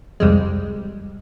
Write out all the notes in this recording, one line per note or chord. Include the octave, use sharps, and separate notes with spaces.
C2 F2 G3 G#3